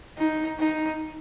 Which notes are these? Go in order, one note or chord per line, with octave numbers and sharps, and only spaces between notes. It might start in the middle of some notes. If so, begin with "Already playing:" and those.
D#4
D#4